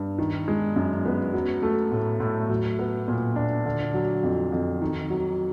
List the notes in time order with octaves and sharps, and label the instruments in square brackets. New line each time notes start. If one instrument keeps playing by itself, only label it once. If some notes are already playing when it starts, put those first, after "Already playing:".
Already playing: [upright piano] G2
D#3
G#3
F#2
B3
F#3
A3
A2
A2
F#3
B3
A#2
D4
D3
F#3
F2
F2
D#3
F#3